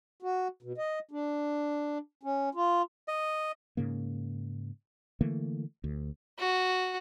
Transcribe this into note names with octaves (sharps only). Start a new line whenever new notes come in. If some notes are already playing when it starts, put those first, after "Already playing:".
F#4
B2
D#5
D4
C#4
F4
D#5
G#2 C#3 A#3
D3 E3 A3 A#3
D2
F#4